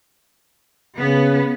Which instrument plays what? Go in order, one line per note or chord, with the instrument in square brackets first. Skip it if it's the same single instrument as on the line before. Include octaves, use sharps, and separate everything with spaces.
[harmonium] C#3 [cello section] B3